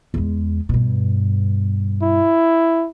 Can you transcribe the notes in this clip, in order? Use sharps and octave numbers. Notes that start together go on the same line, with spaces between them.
E2 G#3
G2 B2
E4